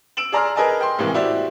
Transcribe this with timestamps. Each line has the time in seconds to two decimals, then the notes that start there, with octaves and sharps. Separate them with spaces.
0.17 E6 D7 E7 F#7
0.32 G#4 D5 A#5 C6 E6 F6
0.56 G#4 A#4 B4 D#5 G#5 A5
0.81 G5 C6
0.98 A2 C3 E3 G#3 A#3
1.14 E4 F#4 G4 C5 D5